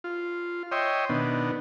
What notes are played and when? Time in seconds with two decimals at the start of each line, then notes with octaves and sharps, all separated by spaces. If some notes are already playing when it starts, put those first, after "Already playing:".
0.04 F4
0.72 C#5 D#5 E5 G5 C6
1.09 B2 D#3 B3 D4